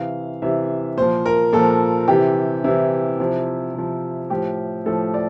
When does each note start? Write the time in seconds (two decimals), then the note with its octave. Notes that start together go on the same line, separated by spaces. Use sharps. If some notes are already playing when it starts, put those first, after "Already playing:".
Already playing: C3 E3 F5
0.42 C3 E3 E5
0.97 A#2 F3 C5
1.26 A#4
1.53 A#2 F3 A4
2.08 C3 E3 G4
2.64 C3 E3 E4
3.20 C3 F3
3.74 C3 F3
4.30 A2 F3 G4
4.86 A2 F3 A4
5.14 D5